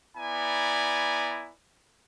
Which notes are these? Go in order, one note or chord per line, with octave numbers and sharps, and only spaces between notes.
B3 E4 D5 G#5 A#5